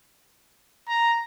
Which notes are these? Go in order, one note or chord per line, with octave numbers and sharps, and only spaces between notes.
A#5